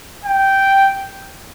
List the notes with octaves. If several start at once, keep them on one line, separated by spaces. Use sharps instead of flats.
G5